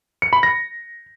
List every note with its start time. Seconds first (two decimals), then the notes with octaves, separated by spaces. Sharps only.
0.22 C#7
0.33 B5
0.43 A#6